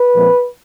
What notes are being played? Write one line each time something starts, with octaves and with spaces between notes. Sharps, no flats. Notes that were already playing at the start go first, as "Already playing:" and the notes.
Already playing: B4
A#2 F3 G#3 C4